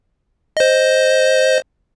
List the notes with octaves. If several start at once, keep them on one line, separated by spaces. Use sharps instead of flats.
C5 D#5